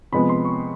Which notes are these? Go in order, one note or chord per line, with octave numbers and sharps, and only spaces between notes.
C3 F3 G#3 B3 B5
C6
C#6